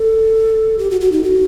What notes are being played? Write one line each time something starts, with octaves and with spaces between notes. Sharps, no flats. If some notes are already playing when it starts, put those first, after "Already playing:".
Already playing: A4
G4
F#4
F#4
D#4
F#4